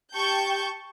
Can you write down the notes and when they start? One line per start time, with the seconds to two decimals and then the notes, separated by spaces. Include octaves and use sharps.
0.14 G4 G5 A5 C#6 G6